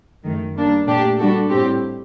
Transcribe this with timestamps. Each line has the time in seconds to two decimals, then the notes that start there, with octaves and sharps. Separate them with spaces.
0.23 F#2 D#3 A3
0.55 G3 A#3 D4
0.86 A#2 A3 D4 G4
1.18 G3 D4 F#4 A4
1.49 A2 G3 C4 G4